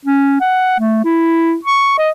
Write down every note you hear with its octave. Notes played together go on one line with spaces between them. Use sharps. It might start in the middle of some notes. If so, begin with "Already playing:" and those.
C#4
F#5
A3
E4
C#6
D#5